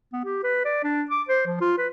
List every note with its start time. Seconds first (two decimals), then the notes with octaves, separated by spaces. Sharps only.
0.13 B3
0.25 G4
0.43 B4
0.65 D5
0.84 D4
1.11 D6
1.29 C5
1.47 F3
1.61 F4
1.78 B4